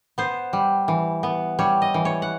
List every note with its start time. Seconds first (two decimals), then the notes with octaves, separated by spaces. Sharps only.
0.18 B3 C5
0.53 G3
0.88 E3
1.23 B3
1.59 G3 C#5
1.82 D#5
1.94 E3
2.05 C#5
2.22 F#5